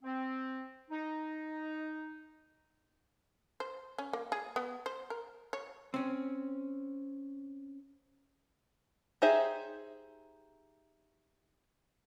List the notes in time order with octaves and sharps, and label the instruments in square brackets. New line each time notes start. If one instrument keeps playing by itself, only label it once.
[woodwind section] C4
D#4
[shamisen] C5
C#4
A#3
G#4
B3
C5
A#4
C#5
[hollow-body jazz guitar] C4 C#4
[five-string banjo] D#4 G4 G#4 C5 E5